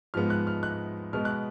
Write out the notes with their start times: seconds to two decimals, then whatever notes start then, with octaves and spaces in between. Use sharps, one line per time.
0.14 G#2 F3 G#3 B3 F6
0.30 F#6
0.47 F6
0.63 F#6
1.13 B2 G#3 B3 F6
1.25 F#6